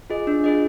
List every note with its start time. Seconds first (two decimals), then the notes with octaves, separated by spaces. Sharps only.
0.10 F4 G#4 D#5
0.27 D4
0.44 F4 G#4 D#5